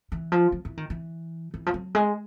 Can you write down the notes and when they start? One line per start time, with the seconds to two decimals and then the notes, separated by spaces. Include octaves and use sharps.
0.12 E3
0.32 F3
0.52 F3
0.65 E3
0.77 D#3
0.90 E3
1.54 E3
1.66 F3
1.74 F#3
1.95 G#3